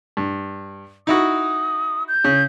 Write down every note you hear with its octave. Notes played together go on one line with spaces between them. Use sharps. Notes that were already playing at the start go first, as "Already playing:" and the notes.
G2
D#4 E4 F#4 D#6
G6
C#3